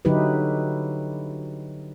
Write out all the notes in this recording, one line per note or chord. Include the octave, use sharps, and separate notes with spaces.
D3 F#3 D#4 E4 G4 B4